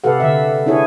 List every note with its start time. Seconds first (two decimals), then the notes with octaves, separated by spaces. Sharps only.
0.04 C3 G4 A4 B4 F5 F#5
0.20 D3 E5
0.66 D4 E4 G#4 C#5